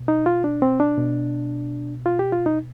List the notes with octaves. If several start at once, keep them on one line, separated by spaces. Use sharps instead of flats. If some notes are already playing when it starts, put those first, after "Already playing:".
Already playing: B2
D#4
F4
D4
C4
D4
B2
F4
G4
F4
D#4